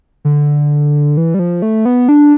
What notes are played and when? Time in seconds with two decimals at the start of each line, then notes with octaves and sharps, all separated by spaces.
0.25 D3
1.17 E3
1.34 G3
1.39 F3
1.62 A3
1.85 B3
2.09 D4